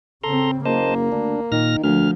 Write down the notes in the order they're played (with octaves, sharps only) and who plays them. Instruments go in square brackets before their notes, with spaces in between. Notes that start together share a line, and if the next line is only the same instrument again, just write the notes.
[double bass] C#3 C4 [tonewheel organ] A4 A#5 C6
[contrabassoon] F#1 [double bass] A#3 [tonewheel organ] C5 D#5 A5
[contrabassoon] D2 [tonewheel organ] D4
[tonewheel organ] A#2 F6 A#6 [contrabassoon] D#3
[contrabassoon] D2 [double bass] F3 [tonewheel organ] F6